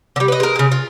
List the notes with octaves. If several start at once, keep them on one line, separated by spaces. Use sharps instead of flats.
D3 G3
B4 D#5
G#3 A#4
C#3 G#3
F4